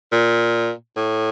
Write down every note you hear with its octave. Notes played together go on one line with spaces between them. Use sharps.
A#2
A2